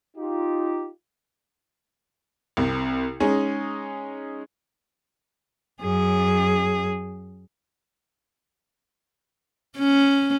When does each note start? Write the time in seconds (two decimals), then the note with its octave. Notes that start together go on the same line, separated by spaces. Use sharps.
0.17 D#4 F4 G4
2.57 C2 C3
3.20 G#3 C#4 D#4 G#4
5.82 F#2 G#4
9.78 C#4